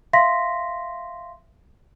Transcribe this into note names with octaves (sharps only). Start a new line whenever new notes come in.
E5 F5 C6 A#6 B6